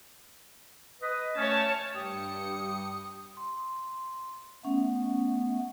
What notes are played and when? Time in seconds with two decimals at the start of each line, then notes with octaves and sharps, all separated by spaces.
1.01 B4 D#5
1.36 A3 C#4 C#5 A5
1.94 G2 G4 D#6 C#7
3.37 C6
4.65 A3 B3 C#4